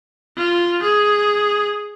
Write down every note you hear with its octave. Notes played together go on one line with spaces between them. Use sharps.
F4
G#4